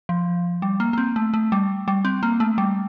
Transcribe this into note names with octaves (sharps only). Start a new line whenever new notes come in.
F3
G3
A#3
A#3
C4
A3
A3
G3
G3
C4
A#3
A3
G3